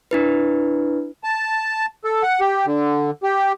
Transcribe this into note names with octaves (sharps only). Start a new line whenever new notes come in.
D4 E4 B4
A5
A4
F#5
G4
D3
G4